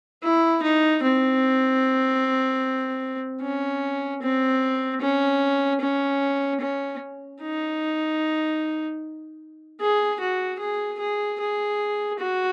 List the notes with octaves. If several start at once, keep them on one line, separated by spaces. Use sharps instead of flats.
E4
D#4
C4
C#4
C4
C#4
C#4
C#4
D#4
G#4
F#4
G#4
G#4
G#4
F#4